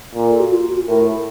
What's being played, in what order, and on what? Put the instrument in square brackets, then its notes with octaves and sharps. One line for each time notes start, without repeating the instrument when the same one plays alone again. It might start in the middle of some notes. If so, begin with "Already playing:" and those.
[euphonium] A#2
[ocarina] A4
F#4
F4
F#4
[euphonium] A2 [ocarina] A#4